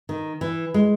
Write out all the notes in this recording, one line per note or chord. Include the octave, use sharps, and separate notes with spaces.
D#3
E3
G#3